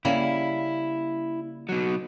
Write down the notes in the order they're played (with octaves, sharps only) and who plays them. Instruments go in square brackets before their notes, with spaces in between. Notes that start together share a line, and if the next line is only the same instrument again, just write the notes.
[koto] C#3 G3 A#3 [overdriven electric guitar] E4
[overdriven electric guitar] B2 F#3